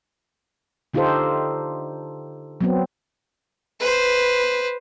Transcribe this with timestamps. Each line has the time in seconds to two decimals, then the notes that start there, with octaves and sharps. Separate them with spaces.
0.94 D3 D#4 F4 G4 A4 C5
2.61 F#3 B3 C4
3.80 B4 C5